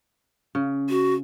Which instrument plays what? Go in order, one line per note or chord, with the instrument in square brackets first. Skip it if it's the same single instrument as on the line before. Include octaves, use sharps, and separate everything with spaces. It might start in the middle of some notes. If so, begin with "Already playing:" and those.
[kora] C#3
[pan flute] F#4